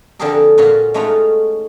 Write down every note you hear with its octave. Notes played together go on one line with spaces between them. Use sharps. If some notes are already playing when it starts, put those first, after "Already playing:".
D3 F3 C4 G4 G#4 A#4
A#2 C#4 F4 F#4
G#3 A3 C#4 D#4 F4 F#4